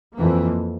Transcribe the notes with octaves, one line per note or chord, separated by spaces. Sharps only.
F2 E3 A#3